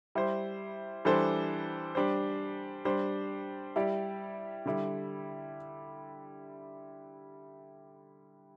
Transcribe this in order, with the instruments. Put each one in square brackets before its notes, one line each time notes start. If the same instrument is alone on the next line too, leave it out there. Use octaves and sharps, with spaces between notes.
[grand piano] G3 E4 C5
E3 G3 D4 A4 C5
G3 D4 C5
G3 D4 C5
G3 E4 G4 D5
D3 G3 E4